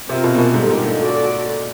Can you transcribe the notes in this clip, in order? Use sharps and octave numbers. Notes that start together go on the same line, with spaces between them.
C3 C4 F4 A#4
B2
A#2
B2
G#2 D3 G3 A#3 D#4 G4
A#2
A#2
C#4 F#4 A4 D5